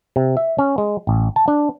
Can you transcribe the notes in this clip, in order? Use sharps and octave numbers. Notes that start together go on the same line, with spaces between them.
C3
E5
C#4
G#3
A1
A5
D4